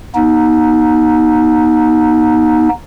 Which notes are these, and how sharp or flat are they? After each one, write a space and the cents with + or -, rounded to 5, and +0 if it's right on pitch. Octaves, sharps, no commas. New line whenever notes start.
B3 -35 D#4 +10